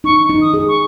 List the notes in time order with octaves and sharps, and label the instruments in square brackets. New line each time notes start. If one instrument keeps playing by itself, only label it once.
[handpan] D#4 [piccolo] C#6
[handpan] D#4
[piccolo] D#6
[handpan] G#4
[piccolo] C#6